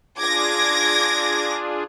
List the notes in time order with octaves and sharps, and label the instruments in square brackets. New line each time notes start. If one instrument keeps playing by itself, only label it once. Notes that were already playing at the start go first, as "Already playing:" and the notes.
[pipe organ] D4 F4 G#4 [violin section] D6 G#6 A#6